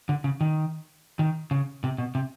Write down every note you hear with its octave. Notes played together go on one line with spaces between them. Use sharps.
D3
C#3
D#3
D#3
C#3
C3
B2
C3